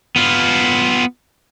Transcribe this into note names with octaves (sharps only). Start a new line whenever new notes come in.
B3 F4